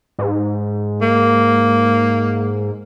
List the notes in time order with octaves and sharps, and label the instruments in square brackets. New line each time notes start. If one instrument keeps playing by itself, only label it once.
[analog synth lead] G#2
[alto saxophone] A#3